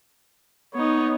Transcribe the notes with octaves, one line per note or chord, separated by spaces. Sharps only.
B3 D#4 C#5